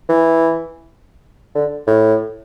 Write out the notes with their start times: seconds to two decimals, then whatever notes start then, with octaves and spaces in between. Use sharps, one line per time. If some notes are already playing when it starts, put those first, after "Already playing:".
0.09 E3
1.55 D3
1.87 A2